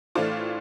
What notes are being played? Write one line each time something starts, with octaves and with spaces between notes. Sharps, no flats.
A2 E3 A3 D4 F4 C5